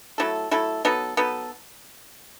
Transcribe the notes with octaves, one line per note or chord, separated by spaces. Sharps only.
F#3 A3 E4 A4
F#3 A3 E4 A4
F#3 B3 D#4 A4
F#3 B3 D#4 A4